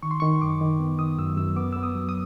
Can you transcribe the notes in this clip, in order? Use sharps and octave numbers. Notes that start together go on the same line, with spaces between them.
D#3 C#6
C6
D#3 C#6
F#2 D6
D#3
B3
D#3 D#6
F#2 E6
F#2 E6
B3 D6
B3 E6
D#6
F#3
D#6